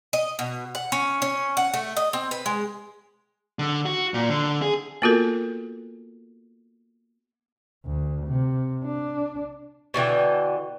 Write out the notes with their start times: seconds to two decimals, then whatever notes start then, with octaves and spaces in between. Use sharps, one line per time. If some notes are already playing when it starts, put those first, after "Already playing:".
0.13 D#5
0.39 B2
0.75 F#5
0.92 C#4
1.22 C#4
1.57 F#5
1.74 A3
1.97 D#5
2.13 C4
2.31 B4
2.46 G#3
3.59 D3
3.86 F#4
4.14 A#2
4.30 D3
4.62 G#4
5.02 A#3 B3 F4 F#4 A4 A#4
7.86 D2
8.27 C3
8.84 D4
9.94 B2 D3 E3 G5